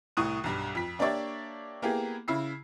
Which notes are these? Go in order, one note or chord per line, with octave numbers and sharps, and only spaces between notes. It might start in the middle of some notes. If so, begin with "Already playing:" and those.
C2 A2 C#6 D#6 F#6 D#7
B1 G2
F2 B6
A#3 D4 G4 C#5 D5 E5
A#3 B3 E4 G4 G#4
C#3 E4 E6 C7